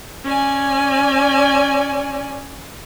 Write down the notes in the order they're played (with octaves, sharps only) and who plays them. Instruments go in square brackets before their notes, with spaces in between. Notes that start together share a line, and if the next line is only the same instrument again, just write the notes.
[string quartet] C#4 D5 G#5